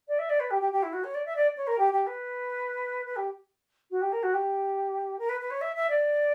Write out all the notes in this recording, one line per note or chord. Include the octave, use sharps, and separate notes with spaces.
D5
E5
D5
B4
G4
G4
G4
E4
F#4
C#5
D5
E5
D5
C#5
A#4
G4
G4
B4
B4
G4
F#4
G4
A#4
F#4
G4
A#4
B4
B4
C#5
E5
E5
D5